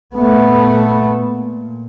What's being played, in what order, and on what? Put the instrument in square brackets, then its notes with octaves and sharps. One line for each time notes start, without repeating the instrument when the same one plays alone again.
[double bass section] A#2 A3 B3